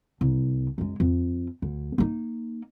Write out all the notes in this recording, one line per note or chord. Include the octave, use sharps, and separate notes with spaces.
C2
F#2 G#3
F2
D2
A#3 D#4